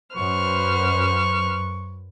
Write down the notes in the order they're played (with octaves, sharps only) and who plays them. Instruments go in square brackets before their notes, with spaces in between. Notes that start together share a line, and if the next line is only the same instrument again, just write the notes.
[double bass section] F#2 [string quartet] B4 C5 F6 [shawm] C#6